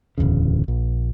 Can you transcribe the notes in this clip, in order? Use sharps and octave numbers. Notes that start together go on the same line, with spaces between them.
D1 A#1 E2 C#3
A#1